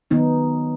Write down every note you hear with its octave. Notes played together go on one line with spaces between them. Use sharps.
D#3 F#3 B3 D#4